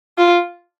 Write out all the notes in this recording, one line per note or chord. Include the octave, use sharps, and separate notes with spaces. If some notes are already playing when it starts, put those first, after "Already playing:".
F4